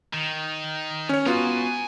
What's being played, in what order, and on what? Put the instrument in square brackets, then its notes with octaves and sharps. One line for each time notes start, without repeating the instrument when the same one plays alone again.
[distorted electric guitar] D#3
[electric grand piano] C#4 C#5
[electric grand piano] B3 F4 F#4 [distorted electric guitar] G#5 A#5